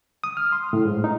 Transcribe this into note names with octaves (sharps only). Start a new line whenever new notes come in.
D#6
F6
C6
A2
G#2
D#4